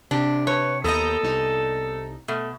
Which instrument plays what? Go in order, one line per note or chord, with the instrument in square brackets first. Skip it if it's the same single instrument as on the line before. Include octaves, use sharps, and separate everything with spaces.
[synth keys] C3 [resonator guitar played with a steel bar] D4 G4
[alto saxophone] B4 [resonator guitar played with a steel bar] C#5
[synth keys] D#2 A#5 G6 [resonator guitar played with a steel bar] B3 D#5 [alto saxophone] A4
[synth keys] C2 D#4
[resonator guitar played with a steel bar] B2 [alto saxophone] A3